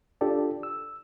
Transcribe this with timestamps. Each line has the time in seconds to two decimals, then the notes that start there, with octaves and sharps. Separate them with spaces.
0.21 D4 F4 G4 A4 D5
0.63 E6